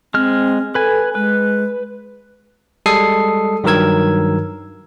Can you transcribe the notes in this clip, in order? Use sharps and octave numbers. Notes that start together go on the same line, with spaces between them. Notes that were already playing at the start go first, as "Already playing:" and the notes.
G#3 C4 F6
A4 B4 G#5
G#3 B4
G3 G#3 A4 D#6 C7
G2 D#3 F#3 A#4 E6 G#6